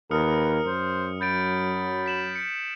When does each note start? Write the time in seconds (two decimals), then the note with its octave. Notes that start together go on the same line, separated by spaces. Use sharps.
0.11 D#2 A#4 B4 D#6 F6 C#7
0.66 F#2 C5
1.21 F#3 B5 G6 A6 D7
2.06 B6 E7 F#7
2.35 B6 C#7